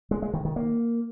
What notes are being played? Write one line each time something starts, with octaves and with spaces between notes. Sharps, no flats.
G#3
G#3
D#3
D#3
A#3